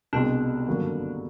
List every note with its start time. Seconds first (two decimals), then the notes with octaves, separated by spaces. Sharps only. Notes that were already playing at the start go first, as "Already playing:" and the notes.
0.13 C2 B2 G#3 C4 D4
0.67 G#1 G2 D3 F#3 A#3